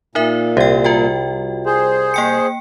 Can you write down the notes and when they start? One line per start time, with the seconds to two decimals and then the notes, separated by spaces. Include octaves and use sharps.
0.15 A#2 D#4 A#4 E5
0.57 C2 G4 G5
0.84 F4 F#4 G5
1.66 G#4 C5
2.14 A#3 G5 C#7